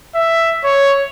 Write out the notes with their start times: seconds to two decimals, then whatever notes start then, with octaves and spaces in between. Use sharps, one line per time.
0.15 E5
0.64 C#5